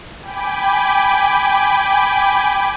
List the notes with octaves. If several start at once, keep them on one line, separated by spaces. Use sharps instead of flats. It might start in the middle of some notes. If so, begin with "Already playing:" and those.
G5 G#5 B5 D6